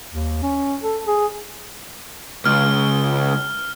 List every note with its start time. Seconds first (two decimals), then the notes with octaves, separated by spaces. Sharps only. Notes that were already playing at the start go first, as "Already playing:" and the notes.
0.13 D#2
0.42 C#4
0.83 A4
1.06 G#4
2.45 C#2 F6